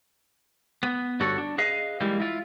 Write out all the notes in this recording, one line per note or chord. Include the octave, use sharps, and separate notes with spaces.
B3
G2 D3 F#4 A4 C#5
D4
G#4 B4 D#5 F5
E3 G3 G#3 A#3
E4 F4